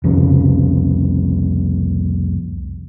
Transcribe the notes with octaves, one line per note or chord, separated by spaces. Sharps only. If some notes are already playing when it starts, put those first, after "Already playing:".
C2 F2 C#3